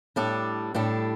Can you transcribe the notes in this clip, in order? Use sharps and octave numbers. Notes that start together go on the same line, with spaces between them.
A2 G3 D4 A4
A2 G3 D4 A4